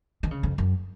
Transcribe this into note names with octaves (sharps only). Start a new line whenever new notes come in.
D#3
C#3
F2
F#2